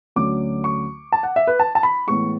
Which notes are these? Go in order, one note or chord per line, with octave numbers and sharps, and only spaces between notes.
D2 D3 F#3 A3 C#4 D6
C#6
A5
F#5
E5
B4
A5
A5
B5
A2 E3 G#3 B3 C#6